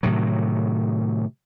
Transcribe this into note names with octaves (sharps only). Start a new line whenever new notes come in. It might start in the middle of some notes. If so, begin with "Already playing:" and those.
A2 C3 D#3 F#3